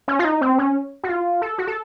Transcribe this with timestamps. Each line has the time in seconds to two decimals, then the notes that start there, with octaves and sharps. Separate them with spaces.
0.08 C#4
0.19 F4
0.25 D#4
0.41 C4
0.58 C#4
1.04 F#4
1.09 F4
1.42 A4
1.58 F#4
1.67 A4